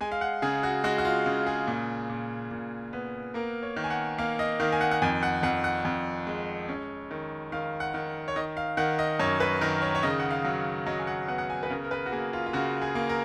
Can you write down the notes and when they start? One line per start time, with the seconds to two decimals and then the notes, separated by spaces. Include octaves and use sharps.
0.01 G#3 G#5
0.12 F5
0.21 F#5
0.42 C#3 G#4
0.63 F#4
0.84 G#3 F#4
0.98 F#4
1.05 F4
1.26 C#3
1.46 G#4
1.67 A#2
2.09 A#2
2.51 A#2
2.93 B3
3.34 A#3 A#4
3.63 C#5
3.76 D#3
3.84 G#5
3.90 F#5
4.18 A#3 F5
4.39 D#5
4.60 D#3 F5
4.72 G#5
4.81 F#5
4.91 F#5
5.02 F2 G#5
5.23 F#5
5.43 F2 F#5
5.64 F#5
5.85 F2
6.27 G#3
6.69 C#4
7.11 D#3
7.52 D#3 F5
7.80 F#5
7.94 D#3
8.28 C#5
8.36 D#3 D#5
8.57 F5
8.77 D#3 F#5
8.99 D#5
9.19 F#2 C#5
9.40 B4
9.61 D#3 A#4
9.82 C#5
9.95 C#5
10.03 C#3 D#5
10.19 F#5
10.30 F5
10.45 F#3
10.86 F#3 D#5
10.99 G#5
11.07 F#5
11.28 B3 F#5
11.38 F#5
11.50 G#5
11.63 B4
11.70 C#3 A#4
11.84 A#4
11.91 B4
12.06 F#4
12.12 A#3 G#4
12.33 F4
12.46 F4
12.53 C#3 F#4
12.82 G#4
12.95 A#3
13.09 A#4